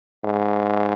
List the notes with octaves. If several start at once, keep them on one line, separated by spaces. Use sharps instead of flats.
G#2